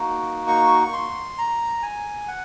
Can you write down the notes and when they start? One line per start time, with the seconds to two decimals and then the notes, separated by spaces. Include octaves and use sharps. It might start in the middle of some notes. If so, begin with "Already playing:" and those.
Already playing: A#3 D#4 F#4
0.48 C#6
0.93 C6
1.38 A#5
1.83 G#5
2.28 F#5